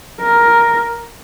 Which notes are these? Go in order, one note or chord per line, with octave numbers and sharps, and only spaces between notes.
A#4